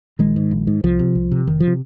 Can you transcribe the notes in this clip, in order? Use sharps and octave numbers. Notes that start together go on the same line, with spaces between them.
A#1 D#3 G#3
G#2
A#1
G#2
C2 F3
C3
C2
C3
F1 D#3
F3
C3